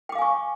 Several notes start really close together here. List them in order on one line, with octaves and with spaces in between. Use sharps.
G5 D6 F5 G#5 C#6